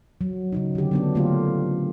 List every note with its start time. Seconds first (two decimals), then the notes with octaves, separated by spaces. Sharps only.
0.21 F#3
0.53 C#3 F#3 D#4
0.75 D3 G4
0.91 F#3 B3 D4
1.15 D3 A3 A#3 F4 G4